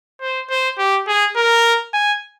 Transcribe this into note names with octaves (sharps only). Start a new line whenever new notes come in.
C5
C5
G4
G#4
A#4
G#5